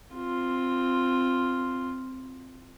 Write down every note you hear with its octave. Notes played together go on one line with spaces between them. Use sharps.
C4 F4